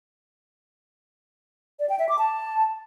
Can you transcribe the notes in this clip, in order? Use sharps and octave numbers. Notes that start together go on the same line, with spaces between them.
D5
G5
E5
D6
A5